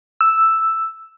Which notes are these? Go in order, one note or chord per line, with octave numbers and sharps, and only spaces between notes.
E6